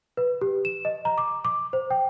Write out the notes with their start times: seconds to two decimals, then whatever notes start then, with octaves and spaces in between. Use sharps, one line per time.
0.17 B4
0.41 G4
0.65 E7
0.85 D#5
1.05 A#5
1.18 D6
1.45 D6
1.73 C5
1.91 G5